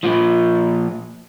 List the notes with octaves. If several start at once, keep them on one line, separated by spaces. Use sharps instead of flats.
A#2 F3